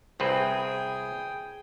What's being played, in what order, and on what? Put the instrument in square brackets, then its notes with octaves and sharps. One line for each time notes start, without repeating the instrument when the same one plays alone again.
[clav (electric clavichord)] C2 C4 B4 [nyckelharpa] G#4 G5